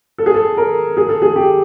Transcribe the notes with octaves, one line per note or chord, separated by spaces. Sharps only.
A4
G#4
A4
A#4
G#4
A4
G#4
G4